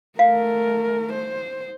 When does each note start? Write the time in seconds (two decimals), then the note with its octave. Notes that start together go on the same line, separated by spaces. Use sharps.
0.19 A3 A#4 F5
1.13 C5